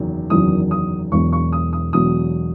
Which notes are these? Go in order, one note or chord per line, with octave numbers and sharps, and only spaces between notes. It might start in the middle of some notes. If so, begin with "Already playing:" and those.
Already playing: F#1 E2 D#3 F#3
F#1 E2 D#3 F#3 D#6
D#6
E1 E2 B2 F#3 C#6
C#6
D#6
D#6
E1 E2 B2 F#3 D#6